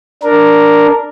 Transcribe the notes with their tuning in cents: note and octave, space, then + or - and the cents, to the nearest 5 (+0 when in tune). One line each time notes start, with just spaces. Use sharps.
D4 +0 A#4 +0